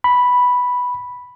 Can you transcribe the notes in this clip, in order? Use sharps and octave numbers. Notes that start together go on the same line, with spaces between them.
B5